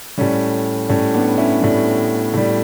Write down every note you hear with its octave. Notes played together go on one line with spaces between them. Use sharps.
A2 G3 C#4
A2 G3 C#4
B3 D4
C#4 E4
A2 G3
A2 G3